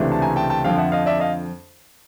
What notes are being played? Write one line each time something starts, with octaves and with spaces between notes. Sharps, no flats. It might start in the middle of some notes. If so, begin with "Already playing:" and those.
Already playing: C#2 C3 E3 A3 D4
A5
G#5 A#5
G5 A5
G5 A5
F2 D3 F3 F5 G5
E5 F#5
D#5 F5
D5 E5
D#5 F5